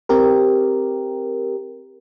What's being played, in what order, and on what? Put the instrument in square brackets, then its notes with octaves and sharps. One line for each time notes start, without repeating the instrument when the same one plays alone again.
[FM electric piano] C4 G4 A#4